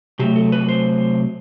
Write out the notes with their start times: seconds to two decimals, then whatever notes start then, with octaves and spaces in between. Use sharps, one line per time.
0.19 C3 F#3 A3 G4
0.36 A4
0.52 B4
0.69 C5